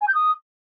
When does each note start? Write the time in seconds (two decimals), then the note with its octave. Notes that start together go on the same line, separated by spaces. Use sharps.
0.01 G#5
0.08 G6
0.14 D#6